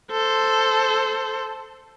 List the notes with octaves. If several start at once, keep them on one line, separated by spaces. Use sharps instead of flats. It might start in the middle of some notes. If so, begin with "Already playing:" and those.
A4 C5